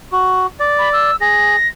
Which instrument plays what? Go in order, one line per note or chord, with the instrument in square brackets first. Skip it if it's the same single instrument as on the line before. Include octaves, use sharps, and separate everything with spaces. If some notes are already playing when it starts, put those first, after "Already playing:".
[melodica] F#4
D5
[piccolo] B5
E6
[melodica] G#4 [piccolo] A#6